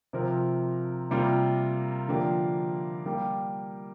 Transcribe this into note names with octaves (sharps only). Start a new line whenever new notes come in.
C3 F3 C4 A#4
C3 G3 A#3 F4 A#4
D3 F3 A#3 D4 G4
G3 A#3 G4